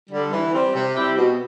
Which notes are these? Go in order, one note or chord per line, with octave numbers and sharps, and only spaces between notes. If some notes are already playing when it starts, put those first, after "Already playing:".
D3 G3
E3
G3 C4
C3
G3 C4 E4 G4
B2